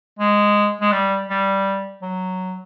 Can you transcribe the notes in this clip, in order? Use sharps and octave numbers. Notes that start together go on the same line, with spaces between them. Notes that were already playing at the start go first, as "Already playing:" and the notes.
G#3
G#3
G3
G3
F#3